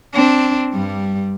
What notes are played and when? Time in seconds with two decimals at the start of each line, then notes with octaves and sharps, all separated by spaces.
0.13 C4 D4
0.73 G2 G3